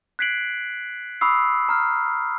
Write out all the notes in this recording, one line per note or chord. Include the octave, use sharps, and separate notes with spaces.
F#6 G#6 B6 C7 D7 F#7
B5 C#6 D#6 E6 C7
A#5 F6